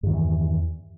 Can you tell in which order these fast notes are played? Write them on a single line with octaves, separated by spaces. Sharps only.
G2 D#3 E2 E3